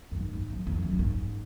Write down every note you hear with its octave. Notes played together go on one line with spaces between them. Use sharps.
F#2
G#2
G#2
F#2
F2
F#2
A#2
G#2